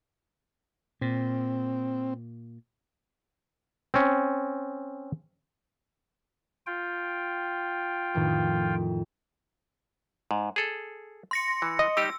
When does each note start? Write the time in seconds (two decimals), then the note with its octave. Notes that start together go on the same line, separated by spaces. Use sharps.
1.01 A#2 C4
3.94 C4 C#4
6.66 F4 G5
8.14 F2 A2 D#3
10.31 G#2
10.56 G#4 A4
11.31 C6 A#6 C#7
11.62 E3
11.79 D#5
11.97 G3 D#4 G4 E6